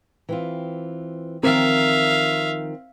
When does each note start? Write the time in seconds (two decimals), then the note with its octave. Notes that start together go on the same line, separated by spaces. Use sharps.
0.29 E3 C4 F4
1.43 D#3 F3 C4 A#4 E5 F5